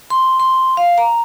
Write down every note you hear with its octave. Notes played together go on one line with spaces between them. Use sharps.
C6
C6
F5
A#5